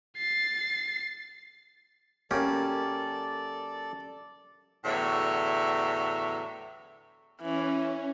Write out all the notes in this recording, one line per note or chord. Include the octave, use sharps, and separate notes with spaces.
A6 C7
F#2 A#3 C#4 G4 A4 D5
E2 A2 D3 F#3 C#5 E5
E3 C#4